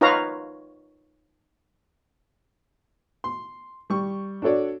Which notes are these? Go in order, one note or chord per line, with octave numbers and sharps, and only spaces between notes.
D#4 F4 B4 C#5 F5 A#5
C6
G3 C#6
D4 F#4 A4 C#5 D5